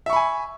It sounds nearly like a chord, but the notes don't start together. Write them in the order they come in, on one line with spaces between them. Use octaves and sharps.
E5 C#6 B5 G#5